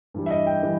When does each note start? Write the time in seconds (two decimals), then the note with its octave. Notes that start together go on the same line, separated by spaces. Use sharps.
0.14 G2 E3 G3
0.26 E5
0.31 D#5
0.47 G5
0.63 E3 G3